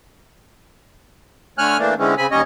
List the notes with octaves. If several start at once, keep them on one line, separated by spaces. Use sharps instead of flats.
D3 A3 C#5 G#5 F6 F#6
E3 A3 A#3 D4
D3 E3 G#3 C4 C#4
C#3 C4 G#5 B5
D#2 G3 C#4 C#5 D#5